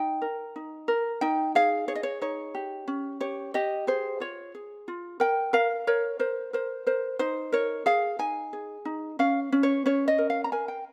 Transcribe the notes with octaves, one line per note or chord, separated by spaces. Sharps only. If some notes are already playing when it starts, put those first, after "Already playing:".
Already playing: D#4 G5
A#4
D#4
A#4
D#4 G5
G#4 F5
G#4 C#5
D#5
C#5
D#4 C#5
G4
C#4
G4 C#5
G4 D#5
G#4 C5
F4 C#5
G#4
F4
A#4 G5
A#4 F5
A#4 C#5
A#4 C5
A#4 C5
A#4 C5
D#4 C5
A#4 C#5
G#4 F5
D#4 G#5
G#4
D#4
C#4 F5
C#4
C#5
C#4 C#5
D#5
A#4
F5
A#5
A#4 G#5
G5